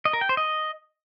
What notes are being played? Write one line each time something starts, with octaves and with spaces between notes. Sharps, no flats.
D#5
A#4
G5
C5
D#5